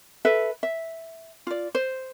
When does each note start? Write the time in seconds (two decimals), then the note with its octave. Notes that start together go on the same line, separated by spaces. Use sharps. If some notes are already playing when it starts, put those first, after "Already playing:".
0.25 A4 B4 E5
0.63 E5
1.47 F4 D5
1.75 C5